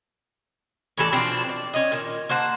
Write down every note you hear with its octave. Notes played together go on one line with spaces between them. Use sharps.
A2 E3 A4 D5
B2 F3 C4 D4
D5
C#4 D#5
A#2 D#3
A#3 C5 F#5 A5